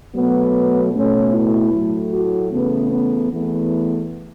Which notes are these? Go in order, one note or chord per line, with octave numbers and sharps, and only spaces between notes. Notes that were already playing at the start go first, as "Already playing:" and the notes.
B2 F#3 A3 B3
B2 A3 C#4
E4
A2 F#3 A3
F#4
E2 C#3 A3 B3
B3
E2 E3 A3 B3